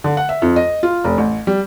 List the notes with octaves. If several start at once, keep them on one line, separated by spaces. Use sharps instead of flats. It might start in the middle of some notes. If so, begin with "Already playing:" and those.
D3
F#5
E5
F2
D#5
F4
F1
A1
G3